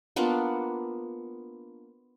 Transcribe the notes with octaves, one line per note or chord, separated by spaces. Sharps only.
A#3 B3 D4 F4